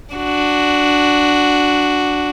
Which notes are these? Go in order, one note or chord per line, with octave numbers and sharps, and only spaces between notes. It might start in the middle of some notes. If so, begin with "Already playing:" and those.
D4 F#4